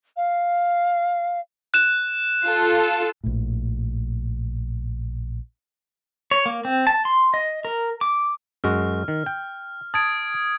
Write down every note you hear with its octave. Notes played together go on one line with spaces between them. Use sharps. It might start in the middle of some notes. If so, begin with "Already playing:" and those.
F5
F#6 E7
F4 A4
A#1 A2
C#5
A#3
C4
A5
C6
D#5
A#4
D6
F#2 G#3 F#4 F6
D#3
G5
A5 D#6 G#6 D7